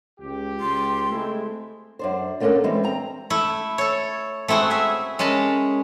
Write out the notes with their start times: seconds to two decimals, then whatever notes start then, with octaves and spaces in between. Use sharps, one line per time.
0.20 C#2 G4
0.60 C#2 C6
1.10 G#3 A3 C4 E4
1.99 F#2 D4 C5
2.40 D3 A3 A#3 C#4 D4 A#4
2.64 E3 G3 G#3 C4 G4
2.84 C4 A#5
3.30 A3 E4
3.78 A4 C#5
4.48 A3 C4 E4 F#4 G#4
4.70 G#4 E5
5.19 G#3 C#4 A#4 A5 B5